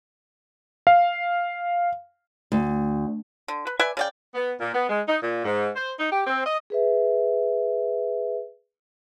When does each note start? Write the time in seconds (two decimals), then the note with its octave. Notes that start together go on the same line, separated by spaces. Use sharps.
0.87 F5
2.52 D2
3.48 D3
3.67 B4
3.80 B4 D5 E5 G#5
3.97 C#3 D5 G5
4.35 B3
4.59 A#2
4.74 B3
4.89 G#3
5.07 D#4
5.22 A#2
5.45 G#2
5.75 C5
5.99 D#4
6.12 G4
6.27 C4
6.45 D#5
6.70 G#4 B4 E5